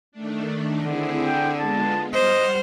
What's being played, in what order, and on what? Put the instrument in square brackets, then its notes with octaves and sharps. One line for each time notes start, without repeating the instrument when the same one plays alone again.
[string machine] D#3 A3 D4
[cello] D3 [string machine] C4 E4 G#4
[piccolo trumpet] G5
[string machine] G#3 B3 F4 [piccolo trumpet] A5
[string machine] G3 F#5 F6 [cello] C5 [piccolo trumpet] D#5